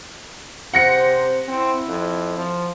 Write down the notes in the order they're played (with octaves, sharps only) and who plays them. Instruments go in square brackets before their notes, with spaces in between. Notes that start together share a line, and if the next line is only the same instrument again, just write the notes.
[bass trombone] C3 [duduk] C5 [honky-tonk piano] F#5 A#6 C#7
[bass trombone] C4 [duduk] E4
[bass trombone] F2
F3